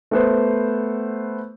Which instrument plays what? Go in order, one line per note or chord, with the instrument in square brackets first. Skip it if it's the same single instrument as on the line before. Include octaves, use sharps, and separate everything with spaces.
[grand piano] A3 B3 C5